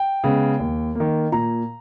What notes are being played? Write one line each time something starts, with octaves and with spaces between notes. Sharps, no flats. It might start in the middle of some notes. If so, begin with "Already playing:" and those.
Already playing: G5
C#3 G#3 B3
D#2
D#3 A#3
A#2 A#5